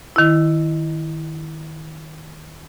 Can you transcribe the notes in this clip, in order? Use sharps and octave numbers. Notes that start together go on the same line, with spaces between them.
D#3 E4